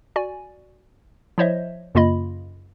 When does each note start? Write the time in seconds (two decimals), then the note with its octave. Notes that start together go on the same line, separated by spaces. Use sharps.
0.16 F#4 D5 G#5
1.38 F3 E4 C5 C#5 D#5 E5
1.95 F#2 C#3 A#3 F4 D#5 B5